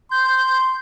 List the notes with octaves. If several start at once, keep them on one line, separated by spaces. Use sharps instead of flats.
C6 G6